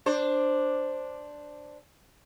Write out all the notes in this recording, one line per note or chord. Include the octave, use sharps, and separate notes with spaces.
D4 C5